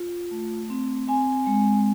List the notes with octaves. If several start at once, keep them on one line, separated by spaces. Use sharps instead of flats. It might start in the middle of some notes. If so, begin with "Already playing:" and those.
Already playing: F4
A3
C4
C4 G#5
G#3